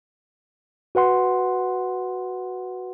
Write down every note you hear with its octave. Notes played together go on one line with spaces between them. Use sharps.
F#4 B4 F#5 C6